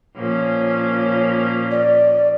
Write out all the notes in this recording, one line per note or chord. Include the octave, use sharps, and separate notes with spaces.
A#2 F3 C#4
D5